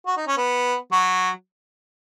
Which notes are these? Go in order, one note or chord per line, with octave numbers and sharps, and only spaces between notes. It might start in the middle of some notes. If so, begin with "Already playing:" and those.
F#4
D#4
C#4
B3
F#3